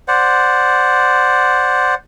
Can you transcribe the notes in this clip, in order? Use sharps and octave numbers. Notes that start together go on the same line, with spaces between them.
C5 D5 F#5